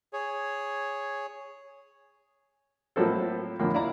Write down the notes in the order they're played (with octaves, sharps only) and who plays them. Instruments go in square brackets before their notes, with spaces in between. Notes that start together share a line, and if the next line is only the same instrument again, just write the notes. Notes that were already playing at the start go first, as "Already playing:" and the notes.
[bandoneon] G#4 C#5
[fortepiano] A2 F3 F#3 A#3 C4 A4
F2 A2 D3 A#3
E4 D5 F5 A#5